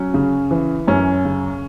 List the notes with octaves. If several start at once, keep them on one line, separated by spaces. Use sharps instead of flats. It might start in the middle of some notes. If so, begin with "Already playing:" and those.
Already playing: F#3 C#4
C#3
E3
F#2 C#4
C#3